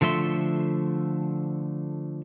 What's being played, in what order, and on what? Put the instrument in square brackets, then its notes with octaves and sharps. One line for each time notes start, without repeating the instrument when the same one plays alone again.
[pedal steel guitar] D3 F3 A3 E5 C6